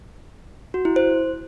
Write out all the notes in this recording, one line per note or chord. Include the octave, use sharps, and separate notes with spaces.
F#4
E4
C5